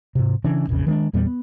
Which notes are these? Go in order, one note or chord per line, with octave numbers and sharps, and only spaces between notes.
G#2 C3
C#3 E3 C#4 D4
E1 A#1 F2 C#3
D#3 G#3 C4 D4
E2 A#2 G3 B3
B3